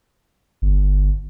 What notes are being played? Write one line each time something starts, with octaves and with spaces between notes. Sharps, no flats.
G1